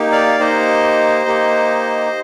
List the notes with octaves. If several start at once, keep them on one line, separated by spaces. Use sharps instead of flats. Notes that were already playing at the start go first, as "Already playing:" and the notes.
Already playing: A#3 D#4 G4
D5 F5
A#3 D#4 G4 C5 D#5
A#3 D#4 G4